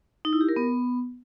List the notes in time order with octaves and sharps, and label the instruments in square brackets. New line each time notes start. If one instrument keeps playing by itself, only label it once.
[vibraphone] D#4
E4
G4
A#4
B3